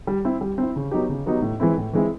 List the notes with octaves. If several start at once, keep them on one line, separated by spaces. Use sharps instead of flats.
G3
C4 E4
G3
C4 E4
C#3
F#3 B3 D#4 G4
C#3
F#3 B3 D#4 G4
A2
E3 G#3 C4 E4
A2
E3 G#3 C4 E4